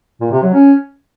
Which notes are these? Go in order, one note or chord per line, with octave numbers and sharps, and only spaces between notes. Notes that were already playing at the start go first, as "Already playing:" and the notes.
A#2
C3
F#3
C#4